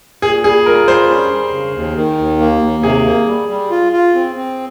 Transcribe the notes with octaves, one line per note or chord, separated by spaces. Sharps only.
A#2 G#4
G3 G#4
F4 A#4
G3 C5
C#4
G3
C#3
D#2
D#3
D#2
A#3
D#2
C3 G#4
A#3
G3
G3
F4
F4
C4
C4